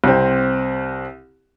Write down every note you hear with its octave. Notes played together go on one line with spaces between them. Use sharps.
C2 C4